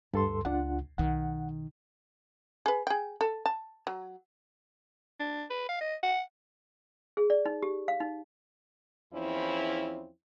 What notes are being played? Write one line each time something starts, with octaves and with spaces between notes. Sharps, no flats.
D2 G2 A4 C6
C#2 D4 F4 F#5
B1 D#3 F#5
G#4 B4
G#4 G5
A4
A5
F#3
D4
B4
F5
D#5
F#5
G#4
D5
D#4
G4
F5
D#4
E2 F3 C4 C#4 E4